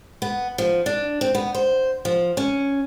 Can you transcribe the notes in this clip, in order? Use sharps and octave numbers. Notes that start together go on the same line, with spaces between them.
B3
F3
D4
C4
B3
C5
F3
C#4